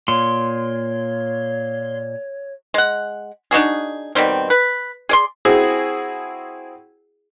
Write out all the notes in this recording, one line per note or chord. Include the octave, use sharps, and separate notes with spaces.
A#2 C#5 C6
G#3 F#5
D4 D#4 F#4 G#4
B2 D#3 G3 C4
B4
G#4 D5 C6
C4 E4 F#4 G#4